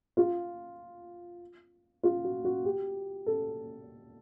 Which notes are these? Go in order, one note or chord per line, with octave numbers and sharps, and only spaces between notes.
F4
F4
F#4
F#4
G4
A4